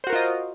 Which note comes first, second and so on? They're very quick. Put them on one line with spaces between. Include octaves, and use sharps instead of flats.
C5 F#4 A#4 F4 D#5